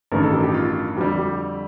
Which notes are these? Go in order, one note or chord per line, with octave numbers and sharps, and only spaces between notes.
A1 G2 D#3 A#4
A4
G4
G4
F4
F2 D3 G3 G4
G4